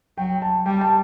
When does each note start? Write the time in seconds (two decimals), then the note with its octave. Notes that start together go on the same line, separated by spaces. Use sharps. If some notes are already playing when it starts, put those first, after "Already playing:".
0.18 F#3 G5
0.42 A5
0.66 G3 G5
0.81 A5